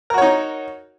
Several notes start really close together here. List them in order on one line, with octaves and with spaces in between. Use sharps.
A#4 F#4 C#5 D#4